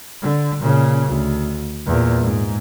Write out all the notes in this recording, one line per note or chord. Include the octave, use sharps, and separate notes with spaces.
D3
A#2 C#3
D2
E2 A#2
G#2